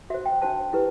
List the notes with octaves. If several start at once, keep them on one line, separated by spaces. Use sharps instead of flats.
F#4 C5 E5
G5
D4 F#4 C5 A5
E4 G4 B4